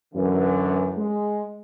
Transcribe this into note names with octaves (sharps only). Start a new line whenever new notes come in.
F#2 D3 E3
G#3